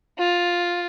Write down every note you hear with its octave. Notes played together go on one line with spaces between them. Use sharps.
F4